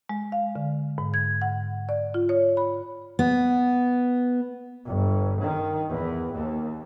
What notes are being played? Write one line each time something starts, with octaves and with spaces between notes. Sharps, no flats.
G#3
F5
D3
G#2
G#6
F#5
D5
F4
C#5
B5
B3
G1
D#3
E2
D#2